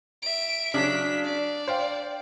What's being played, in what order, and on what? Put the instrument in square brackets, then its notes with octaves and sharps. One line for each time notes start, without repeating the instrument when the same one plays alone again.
[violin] E5 D7
[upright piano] C#3 F#3 [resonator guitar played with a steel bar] D4 [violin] B6
[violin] D5
[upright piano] C5 F5 G5